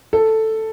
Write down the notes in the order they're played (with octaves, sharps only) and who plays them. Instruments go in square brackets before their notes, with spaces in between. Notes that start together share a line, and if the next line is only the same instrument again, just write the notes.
[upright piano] A4